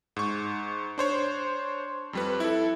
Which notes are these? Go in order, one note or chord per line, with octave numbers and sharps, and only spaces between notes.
G#2 C#6
D4 C5 C#5
F2 G3 B4
E4 A4